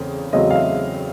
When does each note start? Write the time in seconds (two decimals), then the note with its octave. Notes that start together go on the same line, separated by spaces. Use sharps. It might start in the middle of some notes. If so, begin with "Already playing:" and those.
Already playing: E2 C#3 A3 C4
0.33 E2 C#3 F#3 A3 C4 D#5
0.51 F5
0.56 E5